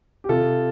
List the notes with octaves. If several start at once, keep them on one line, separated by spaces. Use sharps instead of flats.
G4
C3 F4 A4